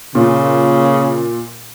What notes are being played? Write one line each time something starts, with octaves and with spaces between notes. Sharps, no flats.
A#2 C#3